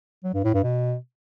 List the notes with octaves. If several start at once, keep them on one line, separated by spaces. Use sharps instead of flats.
F#3
G2
A2
G2
B2